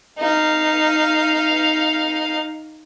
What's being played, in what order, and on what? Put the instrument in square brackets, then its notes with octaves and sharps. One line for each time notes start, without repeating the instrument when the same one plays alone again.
[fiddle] D#4 F5